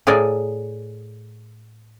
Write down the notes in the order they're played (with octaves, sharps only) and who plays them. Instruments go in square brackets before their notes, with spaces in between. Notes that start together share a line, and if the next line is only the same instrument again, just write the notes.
[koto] A2 G#4 A#4 D5